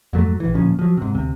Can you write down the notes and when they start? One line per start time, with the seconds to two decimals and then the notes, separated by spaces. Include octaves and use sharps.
0.13 F2 G#2 F#3 A3
0.40 A#1 E3
0.55 D1 A#2 F3 C#4
0.79 F3 F#3
0.97 G#2 C3
1.15 D2 C3